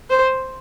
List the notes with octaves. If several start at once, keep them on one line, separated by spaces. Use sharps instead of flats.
C5